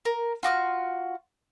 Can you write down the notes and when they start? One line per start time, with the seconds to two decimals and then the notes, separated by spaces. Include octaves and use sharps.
0.05 A#4
0.43 F4 F#4 D6 F6